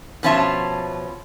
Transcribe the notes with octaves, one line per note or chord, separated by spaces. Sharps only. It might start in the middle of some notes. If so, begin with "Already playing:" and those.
B2 F3 C#4 F4 E5 A5